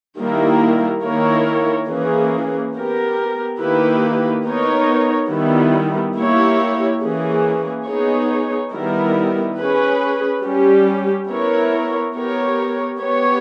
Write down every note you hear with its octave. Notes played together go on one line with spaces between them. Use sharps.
D#3 G3 A#3 E4 A#4
D#3 A#3 E4 A#4 C#5
E3 A#3 C#4 G#4
B3 G4 A#4
D#3 A#3 E4 G4 B4
B3 D#4 A#4 C#5
D#3 G3 B3 E4
A#3 E4 G4 C#5
E3 A#3 C#4 G#4
B3 D#4 G#4 C#5
D#3 G3 B3 E4 A#4
C#4 G#4 B4
G3 C#4 G4
B3 E4 A#4 C#5
B3 G4 A#4 C#5
B3 G4 C#5